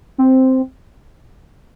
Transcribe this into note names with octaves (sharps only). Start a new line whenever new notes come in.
C4